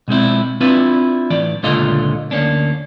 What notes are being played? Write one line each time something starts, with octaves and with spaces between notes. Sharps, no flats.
B2 G#3 C4 E4
C4 D4 E4 F4 B4
A2 E3 D5
C#2 A#2 D3 A3 F4 D#5
D2 A#3 C#4 D4